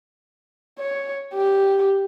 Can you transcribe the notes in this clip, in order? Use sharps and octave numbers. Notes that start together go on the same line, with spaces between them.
C#5
G4